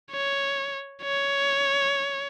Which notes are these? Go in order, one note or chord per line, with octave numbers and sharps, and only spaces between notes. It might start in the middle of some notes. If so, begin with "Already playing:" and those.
C#5
C#5